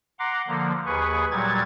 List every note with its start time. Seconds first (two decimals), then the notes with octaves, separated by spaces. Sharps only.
0.19 F#5 A#5 C6 D6
0.48 D3 F3 A#3
0.86 D#2 G#4 B4 C#6
1.31 A#2 F#3 G3 G#6 A6